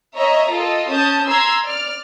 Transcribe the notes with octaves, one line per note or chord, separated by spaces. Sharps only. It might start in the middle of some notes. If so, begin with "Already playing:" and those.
C#5 D#5 E5 A#5
F4 A4 D#5
C#4 A5 D#6 G6
A#5 C6 E6 G#6
D5 F6